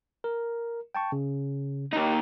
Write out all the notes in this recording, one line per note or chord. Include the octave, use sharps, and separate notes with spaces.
A#4
G5 A5 C#6
C#3
D#2 D#4